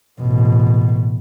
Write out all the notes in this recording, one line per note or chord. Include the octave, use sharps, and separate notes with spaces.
A1 B2